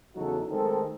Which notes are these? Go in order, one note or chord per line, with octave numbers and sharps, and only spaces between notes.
E2 C#3 F#3 D#4 F#4 A4
D#3 G#3 A3 C4 A4